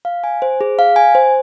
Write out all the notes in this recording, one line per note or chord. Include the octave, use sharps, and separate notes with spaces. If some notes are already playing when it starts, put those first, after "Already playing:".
F5
G#5
C5
G#4
F5
G#5
C5